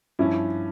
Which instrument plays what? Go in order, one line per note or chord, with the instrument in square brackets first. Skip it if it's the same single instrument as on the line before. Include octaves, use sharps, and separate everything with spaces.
[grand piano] G2 F3 C#4 [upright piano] E4